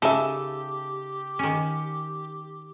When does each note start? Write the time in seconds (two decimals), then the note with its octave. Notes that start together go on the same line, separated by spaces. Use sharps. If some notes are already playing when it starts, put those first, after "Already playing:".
0.02 C#3 D#4 G4 A4 E5
1.39 D#3 C#4